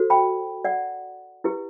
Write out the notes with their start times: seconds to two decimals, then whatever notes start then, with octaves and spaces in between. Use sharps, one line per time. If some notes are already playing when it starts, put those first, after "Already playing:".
Already playing: F#4 A4 C5
0.10 G5 B5
0.65 D5 F#5
1.44 E4 G4 B4